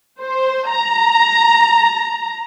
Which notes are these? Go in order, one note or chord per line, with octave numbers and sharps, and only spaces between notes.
C5
A#5